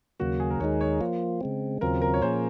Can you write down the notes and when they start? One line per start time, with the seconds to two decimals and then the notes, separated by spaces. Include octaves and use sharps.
0.20 D#2 C#3 F#3 A#3 F#4
0.40 G#4
0.50 A#4
0.60 D#2 D#3 G#3 D#4 G#4 C#5
0.81 C#5
1.01 F3 A#3 F4
1.41 C#3 G#3 C4
1.81 D#2 C#3 F#3 C4 F4 A#4
2.02 A#4
2.14 C#5
2.22 A#2 F3 A#3 C#4 G#4 C5